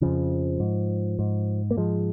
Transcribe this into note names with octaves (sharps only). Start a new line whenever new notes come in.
F2 C#3 F3
G#2
G#2
A#3
G#2 F3 G#3